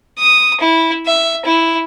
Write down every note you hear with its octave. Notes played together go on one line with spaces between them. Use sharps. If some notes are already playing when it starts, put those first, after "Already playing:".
D#6
E4
E5
E4